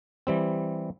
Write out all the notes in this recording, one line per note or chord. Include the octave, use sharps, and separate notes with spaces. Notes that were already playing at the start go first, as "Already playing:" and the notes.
E3 G3 C4